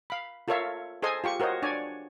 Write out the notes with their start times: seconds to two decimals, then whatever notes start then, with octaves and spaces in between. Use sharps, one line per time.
0.10 F5 B5
0.48 F4 A4 A#4 C#5 E5 F5
1.02 G#4 A4 C5 D#5 G#5 C6
1.24 F4 G4 C#6
1.40 F#4 A#4 C5 C#5 D#5
1.62 D4 C#5 D5 G#5